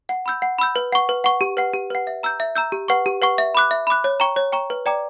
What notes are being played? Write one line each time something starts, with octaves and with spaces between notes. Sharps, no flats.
F#5
B5 E6 G6
F#5
B5 E6 G6
B4
F#5 C#6
B4
F#5 C#6
G4
B4 F#5
G4
B4 F#5
E5
A#5 E6 G6
E5
A#5 E6 G6
G4
B4 F#5 C#6
G4
B4 F#5 C#6
E5
B5 D6 F#6
E5
B5 D6 F#6
C#5
G5 A#5 C#6
C#5
G5 A#5 C#6
B4
D5 G5 A#5 D6